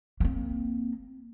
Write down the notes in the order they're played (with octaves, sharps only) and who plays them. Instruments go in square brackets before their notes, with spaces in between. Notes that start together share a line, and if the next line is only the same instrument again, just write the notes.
[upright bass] A#3 C4